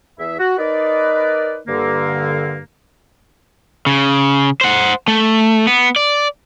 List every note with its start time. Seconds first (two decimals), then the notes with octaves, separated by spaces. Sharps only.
0.19 E2 G#4 E5
0.39 F#4
0.58 D#4 A#4 B4 D5
1.67 G2 D3 A#3
3.86 C#3
4.61 C5 F#5
5.08 A3
5.67 B3
5.96 D5